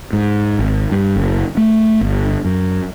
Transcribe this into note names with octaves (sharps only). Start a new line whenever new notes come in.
G#2
G#1
G2
F#1
A3
G1
F#2